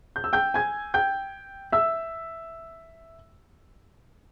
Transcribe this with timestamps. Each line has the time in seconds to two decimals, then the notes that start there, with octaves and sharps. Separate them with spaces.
0.16 G6
0.24 E6
0.33 G5 G6
0.54 G#5 G#6
0.94 G5 G6
1.72 E5 E6